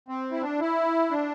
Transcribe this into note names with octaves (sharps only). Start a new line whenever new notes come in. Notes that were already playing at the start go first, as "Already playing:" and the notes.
C4
E4
D4
E4
D4